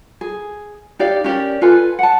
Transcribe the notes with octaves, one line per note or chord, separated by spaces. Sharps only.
G#4
D#4 G4 D5 F5
C#4 G4 A#4 D5
F4 A4 B4 G#5
F#5 A5